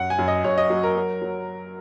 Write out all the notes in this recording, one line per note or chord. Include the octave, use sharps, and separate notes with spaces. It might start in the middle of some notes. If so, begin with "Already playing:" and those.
Already playing: F#2 F#5
G#5
F#2
D#5
F#2 C#5
D#5
F#3
A#4
F#3
F#3